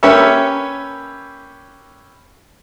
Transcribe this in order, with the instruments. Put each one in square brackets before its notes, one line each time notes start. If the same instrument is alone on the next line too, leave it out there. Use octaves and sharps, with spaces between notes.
[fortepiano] A#3 C#4 G4 B4 C#5 E5